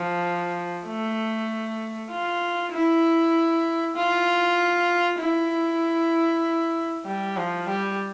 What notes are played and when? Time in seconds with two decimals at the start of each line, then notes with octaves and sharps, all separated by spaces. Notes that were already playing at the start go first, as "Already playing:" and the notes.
Already playing: F3
0.86 A3
2.10 F4
2.73 E4
3.96 F4
5.20 E4
7.06 G3
7.37 F3
7.68 G3